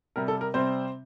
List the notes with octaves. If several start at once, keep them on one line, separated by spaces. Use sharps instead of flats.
C3 G3 A#4
A4
A#4
C3 G3 C4 C5